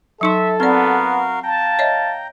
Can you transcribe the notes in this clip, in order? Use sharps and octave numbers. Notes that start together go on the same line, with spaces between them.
F#3 D#4 A4 E5 C6
B3 C4 F#4 A#4 D5 F5
F5 G5 A5 A#5
C#5 D#5 E5